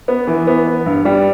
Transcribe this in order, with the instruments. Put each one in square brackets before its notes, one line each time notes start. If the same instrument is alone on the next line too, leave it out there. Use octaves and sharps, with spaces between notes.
[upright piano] B3
E3
B3
B3
G2
G3